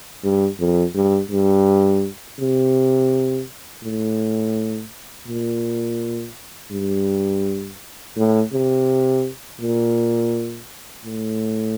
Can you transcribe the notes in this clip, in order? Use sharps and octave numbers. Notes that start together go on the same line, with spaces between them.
G2
F2
G2
G2
C3
A2
A#2
G2
A2
C3
A#2
A2